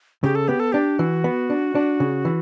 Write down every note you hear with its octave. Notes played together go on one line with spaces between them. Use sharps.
C#3 G4
A4
B3 G4
A4
D4 G4
E3 F#4
B3
D4
D4
C#3
E3